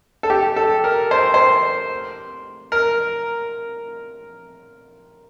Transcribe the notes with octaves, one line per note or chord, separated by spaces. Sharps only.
A4
G4
A4
A#4
C5
C5
A#4